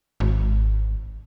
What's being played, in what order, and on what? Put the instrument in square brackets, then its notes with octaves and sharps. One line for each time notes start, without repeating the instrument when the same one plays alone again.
[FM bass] G#1